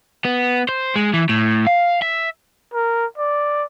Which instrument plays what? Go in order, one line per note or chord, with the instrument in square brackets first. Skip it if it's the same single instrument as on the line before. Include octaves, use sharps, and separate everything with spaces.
[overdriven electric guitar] B3
C5
G#3
E3
A2
F5
E5
[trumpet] A#4
D5